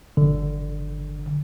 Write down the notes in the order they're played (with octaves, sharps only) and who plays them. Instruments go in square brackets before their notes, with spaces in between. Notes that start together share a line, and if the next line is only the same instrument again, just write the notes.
[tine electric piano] G1 D3